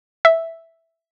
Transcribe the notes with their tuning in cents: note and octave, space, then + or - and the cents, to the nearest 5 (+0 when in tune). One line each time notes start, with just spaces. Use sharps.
E5 -5